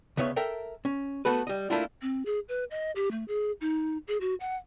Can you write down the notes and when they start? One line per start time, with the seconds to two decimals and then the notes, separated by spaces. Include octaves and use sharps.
0.17 D2 C#3 B3 C#5 E5
0.36 A4 A#4 E5 G5
0.85 C#4
1.25 A3 B3 F#4 A4 B4
1.47 G3 D#5
1.70 A3 A#3 D4 E4 F4
2.02 C4
2.25 G#4
2.49 B4
2.71 D#5
2.96 G4
3.11 A3
3.28 G#4
3.61 D#4
4.08 G#4
4.21 F#4
4.40 F#5